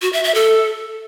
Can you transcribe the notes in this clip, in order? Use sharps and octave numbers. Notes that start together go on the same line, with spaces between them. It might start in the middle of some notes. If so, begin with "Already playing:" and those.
F#4
E5
E5
A4